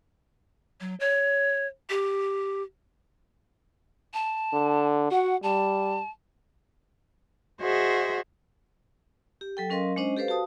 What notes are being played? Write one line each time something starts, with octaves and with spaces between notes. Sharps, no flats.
F#3
C#5
G4
A5
D3
F#4 F#5
G3 A5
F#4 G#4 C5 D#5 E5
G4
F#3 A4 G5
F#3 C#4 A#4 D#5 F5 C6
G#3 C#4 D4 C5 D#5
G4 A4 B4 C5 F5
F#4 F5 A5 D#6